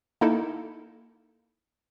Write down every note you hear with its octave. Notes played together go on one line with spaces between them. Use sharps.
A#3 D#4 E4 A4